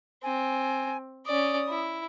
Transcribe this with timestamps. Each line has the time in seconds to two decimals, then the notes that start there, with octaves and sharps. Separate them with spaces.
0.23 C4 G#5
1.26 C#4 D5 D#6
1.68 E4